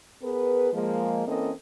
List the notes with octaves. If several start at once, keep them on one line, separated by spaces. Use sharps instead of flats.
B3 G#4 A#4 B4
F3 G#3 A#3
E3 A#3 C4 C#4 A4 D#5